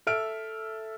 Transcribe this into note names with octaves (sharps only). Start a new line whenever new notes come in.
A4 E5 F6 D7